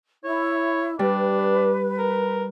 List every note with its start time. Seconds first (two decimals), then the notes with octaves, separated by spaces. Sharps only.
0.24 E4 C#5
0.99 G3 D4 B4
1.99 A#4